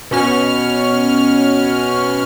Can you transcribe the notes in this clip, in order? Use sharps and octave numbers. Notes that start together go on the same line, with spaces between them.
B2 C#4 F6